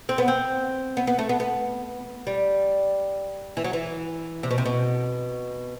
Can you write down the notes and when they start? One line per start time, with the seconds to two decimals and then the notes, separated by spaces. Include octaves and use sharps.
0.09 C4
0.18 B3
0.28 C4
0.97 B3
1.07 B3
1.19 A3
1.29 B3
1.40 B3
2.27 G3
3.57 E3
3.64 F#3
3.73 E3
4.43 C3
4.51 B2
4.58 C3
4.65 B2